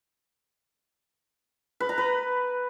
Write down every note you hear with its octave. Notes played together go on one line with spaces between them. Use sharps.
B4
A#5
B4